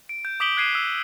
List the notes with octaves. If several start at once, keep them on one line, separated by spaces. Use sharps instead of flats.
D7
G6
D6 D#6 B6 D7 F#7 G7
F#6 G#6 C7 D#7 E7
E6